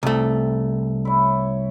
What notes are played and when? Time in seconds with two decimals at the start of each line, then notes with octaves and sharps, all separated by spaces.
0.03 C2 A3
1.05 E4 C#5